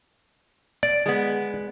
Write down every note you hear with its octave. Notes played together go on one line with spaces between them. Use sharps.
D5
G#3 B3